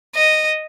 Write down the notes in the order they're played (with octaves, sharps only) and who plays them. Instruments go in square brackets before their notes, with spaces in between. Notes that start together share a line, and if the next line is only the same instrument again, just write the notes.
[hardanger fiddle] D#5